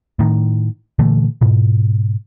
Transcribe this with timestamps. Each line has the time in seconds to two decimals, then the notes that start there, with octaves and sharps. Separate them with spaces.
0.19 A2 D#3
0.99 A#2 D3 E3 A3
1.41 G#2 B2